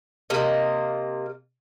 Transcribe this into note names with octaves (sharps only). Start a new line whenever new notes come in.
C3 A#3 D#5